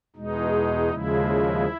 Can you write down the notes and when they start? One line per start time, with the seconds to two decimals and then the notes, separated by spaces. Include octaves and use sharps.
0.15 E2 B2 G#3 D#4
0.90 D#2 C#3 F3 G#3 E4